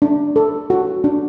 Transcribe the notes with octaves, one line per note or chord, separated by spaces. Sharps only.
D4
A4
F#4
D4